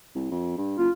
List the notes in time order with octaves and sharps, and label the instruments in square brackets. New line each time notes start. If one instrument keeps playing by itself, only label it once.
[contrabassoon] C2
F2
G2
[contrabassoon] F#1 [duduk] F4